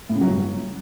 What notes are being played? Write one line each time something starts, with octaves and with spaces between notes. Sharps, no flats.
A2
C#3
F#3
G2